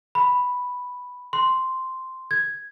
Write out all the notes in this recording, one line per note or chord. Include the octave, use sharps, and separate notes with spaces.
B5
C6
G#6